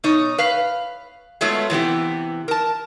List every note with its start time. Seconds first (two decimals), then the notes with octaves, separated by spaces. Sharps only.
0.04 B2 D#4 C#5
0.38 B4 F5
1.41 F#3 G#3 A3 B3 F4 C#5
1.70 C3 E3 B3 G4
2.48 A#4 A5